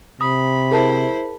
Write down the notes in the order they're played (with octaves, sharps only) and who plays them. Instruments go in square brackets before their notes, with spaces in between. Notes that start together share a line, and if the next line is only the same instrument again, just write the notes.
[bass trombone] C3 [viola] B5 [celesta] D#6
[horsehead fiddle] E4 C5 [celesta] G#4 A#4 A5